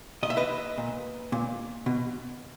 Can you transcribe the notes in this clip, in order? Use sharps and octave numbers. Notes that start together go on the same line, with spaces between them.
A#2 D#5
E5
B4 D#5
A#2
A#2
B2